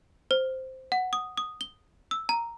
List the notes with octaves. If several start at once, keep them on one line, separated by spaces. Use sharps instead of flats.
C5
F#5
D#6
D#6
G7
E6
A#5